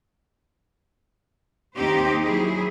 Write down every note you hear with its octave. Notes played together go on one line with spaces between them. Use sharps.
D#2 C4 D#4 G4 C5
F#3 E4 G#4